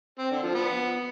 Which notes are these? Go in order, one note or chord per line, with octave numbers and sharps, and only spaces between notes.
C4
D3
F3
B3